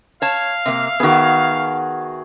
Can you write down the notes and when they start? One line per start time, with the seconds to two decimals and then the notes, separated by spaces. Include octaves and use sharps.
0.22 C#5 F5 A5
0.65 C3 A#3 E5
1.00 D#3 B3 F#4 G#4